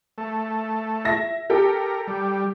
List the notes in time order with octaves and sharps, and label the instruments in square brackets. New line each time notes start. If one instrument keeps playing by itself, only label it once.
[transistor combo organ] A3
[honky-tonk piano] E5 A#6
[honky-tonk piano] G4 A4 G5 [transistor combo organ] A#4
[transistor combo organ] G3